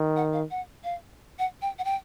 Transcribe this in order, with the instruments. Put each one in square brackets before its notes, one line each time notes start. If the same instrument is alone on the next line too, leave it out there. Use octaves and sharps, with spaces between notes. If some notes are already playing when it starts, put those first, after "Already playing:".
Already playing: [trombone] D#3
[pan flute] F#5
F5
F#5
F5
F#5
G5
F#5
G5